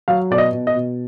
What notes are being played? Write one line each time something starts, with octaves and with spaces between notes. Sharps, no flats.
F#3 F5
B2 D5
D#5
B2
D#5
B2